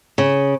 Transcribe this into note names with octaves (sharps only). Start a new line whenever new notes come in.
C#3